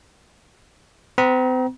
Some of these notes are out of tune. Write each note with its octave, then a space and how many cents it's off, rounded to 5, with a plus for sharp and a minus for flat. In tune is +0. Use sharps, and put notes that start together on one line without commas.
C4 -40 A#5 +30